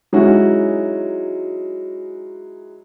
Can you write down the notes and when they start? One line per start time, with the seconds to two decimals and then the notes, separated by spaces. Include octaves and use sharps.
0.13 F#3 G#3 C#4 D#4 E4 F#4